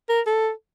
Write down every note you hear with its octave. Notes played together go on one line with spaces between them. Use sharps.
A#4
A4